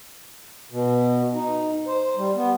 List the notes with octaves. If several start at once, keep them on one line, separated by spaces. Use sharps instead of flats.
B2
D#4
C5
G3
B3